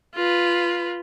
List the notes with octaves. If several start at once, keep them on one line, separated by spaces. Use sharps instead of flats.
F4 B4